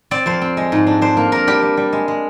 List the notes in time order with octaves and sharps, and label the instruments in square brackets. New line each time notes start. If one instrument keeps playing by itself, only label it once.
[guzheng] C4 D5
F2 C5
C4
G#3
G#2
D4
D4 C5
A#3
D4 A#4
G3 G4
G3
G3
G#3
G#3